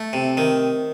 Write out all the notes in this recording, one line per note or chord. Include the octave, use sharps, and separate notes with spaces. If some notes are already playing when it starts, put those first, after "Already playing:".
Already playing: A3
C3
D#3